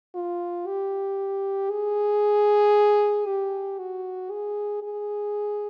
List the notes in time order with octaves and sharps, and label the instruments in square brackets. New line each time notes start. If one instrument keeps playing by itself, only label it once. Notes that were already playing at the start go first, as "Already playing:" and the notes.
[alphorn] F4
G4
G#4
G4
F#4
G#4
G#4